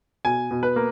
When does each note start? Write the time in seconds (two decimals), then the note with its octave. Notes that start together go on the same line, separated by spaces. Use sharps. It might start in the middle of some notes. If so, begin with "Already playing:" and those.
0.25 B2 G#5
0.51 B2
0.63 B4
0.76 A#3